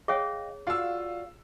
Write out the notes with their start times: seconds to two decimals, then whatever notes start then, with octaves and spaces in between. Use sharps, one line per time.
0.08 G#4 C#5 D#5 F5 G5
0.67 F4 F#4 D5 F5 E6